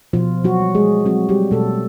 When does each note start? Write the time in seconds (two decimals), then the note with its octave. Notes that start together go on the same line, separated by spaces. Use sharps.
0.13 B2 F3 F4
0.44 F#3 F#4
0.60 G3
0.75 G#3 G#4
1.06 F#3 C4 F#4
1.29 G3 G4
1.51 B2 A3 A4